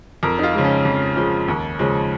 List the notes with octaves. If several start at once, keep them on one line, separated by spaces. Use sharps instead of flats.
F2 A#4
D#4
F4
C#3 F3 G#3
C#4
F2
C#3 F3 G#3
D#2
C#3 F3 G#3